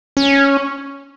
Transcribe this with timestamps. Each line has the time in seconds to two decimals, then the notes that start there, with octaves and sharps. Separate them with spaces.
0.17 C#4